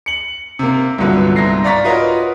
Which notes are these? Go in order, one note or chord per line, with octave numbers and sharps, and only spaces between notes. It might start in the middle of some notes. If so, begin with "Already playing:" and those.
C#7 F#7
C3 A#3
C2 G2 A#2 D3 F#3 B3
C2 G#2 A#6 C7
D5 F5 A#5 C#6 A6 B6
F4 F#4 A#4 B4 C#5 D#5